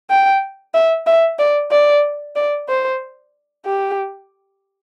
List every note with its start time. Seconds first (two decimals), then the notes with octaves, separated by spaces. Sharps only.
0.10 G5
0.74 E5
1.07 E5
1.39 D5
1.71 D5
2.36 D5
2.69 C5
3.65 G4